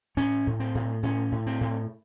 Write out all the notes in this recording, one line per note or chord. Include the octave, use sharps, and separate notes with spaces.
A2 C#4
A2
C4
A2
A2 C#4
A2
C4
A2